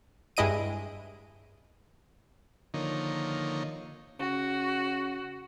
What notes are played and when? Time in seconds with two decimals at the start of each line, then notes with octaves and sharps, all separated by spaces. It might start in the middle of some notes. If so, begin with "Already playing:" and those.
0.37 G2 G#3 E4 D#5 D7 D#7
2.74 D3 D#3 F3 A#3 D#4 C#5
4.20 C#3 F#4